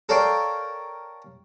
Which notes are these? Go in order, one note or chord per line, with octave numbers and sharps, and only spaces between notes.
A4 A#4 C#5 D5 F5 G5